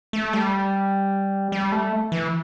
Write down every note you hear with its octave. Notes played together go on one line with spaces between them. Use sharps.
A3
G3
G3
A3
E3